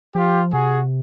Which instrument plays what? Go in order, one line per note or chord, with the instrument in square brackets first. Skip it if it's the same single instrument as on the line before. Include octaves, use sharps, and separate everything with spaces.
[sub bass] F3 [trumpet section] F4 G4
[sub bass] C3 [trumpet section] F#4 G#4